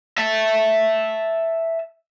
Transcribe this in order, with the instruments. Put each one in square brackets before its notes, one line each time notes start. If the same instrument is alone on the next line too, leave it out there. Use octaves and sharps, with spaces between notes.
[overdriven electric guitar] E5 A5